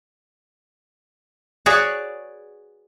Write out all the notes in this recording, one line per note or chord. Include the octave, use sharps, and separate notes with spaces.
F#4 G#4 B4 C#5 D5